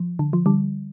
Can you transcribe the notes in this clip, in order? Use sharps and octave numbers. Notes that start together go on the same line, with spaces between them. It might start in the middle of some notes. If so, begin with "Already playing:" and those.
Already playing: F3
D3
F3
D3 G3